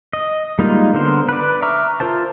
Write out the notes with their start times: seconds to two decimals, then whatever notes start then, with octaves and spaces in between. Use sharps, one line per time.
0.13 D#5
0.59 G3 G#3 A#3 D#4 F4
0.94 D3 B3 A#4 C5
1.29 B4 D5
1.62 E5 A#5 C#6 D6 F6
2.00 F4 A#4 C5 A5